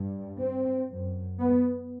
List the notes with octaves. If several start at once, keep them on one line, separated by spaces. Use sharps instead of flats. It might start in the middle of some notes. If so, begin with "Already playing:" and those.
Already playing: G2
C4
F#2
B3